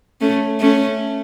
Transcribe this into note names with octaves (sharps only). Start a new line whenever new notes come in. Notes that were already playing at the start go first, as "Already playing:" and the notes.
A3 C#4
A3 C#4